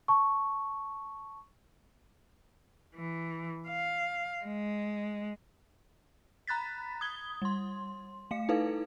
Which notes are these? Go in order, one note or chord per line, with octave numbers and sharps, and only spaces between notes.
A5 C#6
E3
F5
G#3
A#5 B5 F#6 A6 B6
D#6 G#6 G7
G3 C6
A3 F5 C#7
D#4 E4 A4 B4 F5